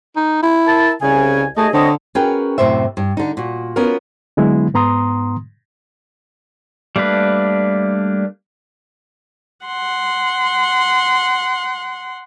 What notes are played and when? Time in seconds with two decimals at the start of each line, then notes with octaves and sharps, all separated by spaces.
0.16 D#4
0.43 E4
0.67 A#4 A5
1.02 C2 C#3 G#5
1.57 D#2 A3 G#4 D#5
1.74 D3 C4 C#5 D#5
2.15 C#4 F#4 G#4 A#4 B4 G5
2.58 F#2 A2 C3 C5 E5
2.97 G2
3.17 D3 D#4
3.37 A#2 F#4
3.76 B3 C#4 F4 F#4 A#4
4.37 D3 F#3 G#3 B3 E4
4.74 G#2 B3 A#5 C6 D#6
6.96 G3 A3 A#3 D4 B4
9.66 F#5 C6